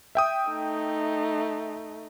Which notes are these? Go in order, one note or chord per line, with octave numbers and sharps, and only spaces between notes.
E5 G5 D#6
A3 D#4